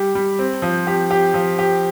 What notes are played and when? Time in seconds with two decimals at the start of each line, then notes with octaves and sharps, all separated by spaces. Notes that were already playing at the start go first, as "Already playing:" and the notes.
Already playing: G3 G4
0.15 G3
0.39 C4
0.62 F3
0.87 G4
1.11 G4
1.34 F3
1.59 G4